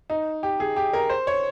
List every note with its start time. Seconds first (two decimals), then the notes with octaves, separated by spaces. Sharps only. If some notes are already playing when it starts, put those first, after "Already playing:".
0.10 D#4
0.43 G4
0.60 G#4
0.76 G4
0.93 A#4
1.10 C5
1.27 C#5